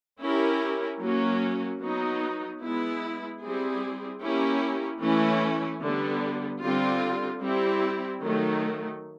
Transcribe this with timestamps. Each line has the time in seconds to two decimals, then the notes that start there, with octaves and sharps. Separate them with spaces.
0.20 C#4 E4 G4 A#4
1.01 F#3 A#3 C#4 F#4
1.80 F#3 B3 D#4
2.61 G#3 B3 E4
3.40 G3 C4 E4 G#4
4.20 A#3 C#4 E4 G4 A#4
5.00 E3 A3 C#4 E4
5.81 D3 G3 B3
6.61 D3 G3 C4 F4
7.41 G3 C4 E4 G4
8.21 D#3 F#3 A3